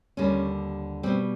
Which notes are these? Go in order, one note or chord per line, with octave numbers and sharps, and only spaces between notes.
D#2 D3 G3 C#4
B2 G3 C4